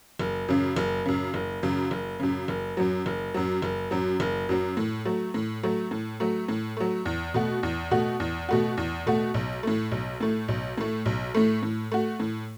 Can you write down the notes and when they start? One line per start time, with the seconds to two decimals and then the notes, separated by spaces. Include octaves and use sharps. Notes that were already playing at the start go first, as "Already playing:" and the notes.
0.19 F#1
0.48 F#2 C#3
0.77 F#1
1.06 F#2 C#3
1.34 F#1
1.63 F#2 C#3
1.91 F#1
2.20 F#2 C#3
2.48 F#1
2.77 F#2 F#3
3.06 F#1
3.34 F#2 F#3
3.62 F#1
3.91 F#2 F#3
4.20 F#1
4.49 F#2 F#3
4.77 A2
5.05 F#3 A3
5.34 A2
5.63 F#3 A3
5.91 A2
6.20 F#3 A3
6.48 A2
6.77 F#3 A3
7.05 E2
7.34 B2 A3 F#4
7.63 E2
7.91 B2 A3 F#4
8.20 E2
8.49 B2 A3 F#4
8.77 E2
9.06 B2 A3 F#4
9.34 B1
9.63 A2 A3
9.91 B1
10.20 A2 A3
10.48 B1
10.78 A2 A3
11.06 B1
11.35 A2 A3
11.63 A2
11.92 A3 F#4
12.20 A2